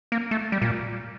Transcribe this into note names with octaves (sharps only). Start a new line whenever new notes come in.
A#3
A3
G3
A#2